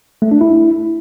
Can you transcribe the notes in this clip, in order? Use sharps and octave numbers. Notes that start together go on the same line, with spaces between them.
A3
D4
E4